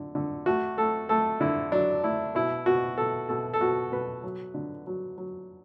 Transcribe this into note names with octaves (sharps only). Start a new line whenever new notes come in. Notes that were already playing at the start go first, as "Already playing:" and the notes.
Already playing: D3
D3
A3 F#4
A3 A4
A3 A4
D3 E4
F#3 D4
A3 E4
B2 E4
B2 F#4
B2 A4
B2 A4
A4
B2 F#4
B2 B4
F#3
D3
F#3
F#3